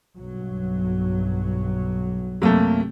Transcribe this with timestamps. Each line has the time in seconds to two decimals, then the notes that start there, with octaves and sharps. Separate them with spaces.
0.18 B1 G2 F#3
2.42 F#2 C3 A3 A#3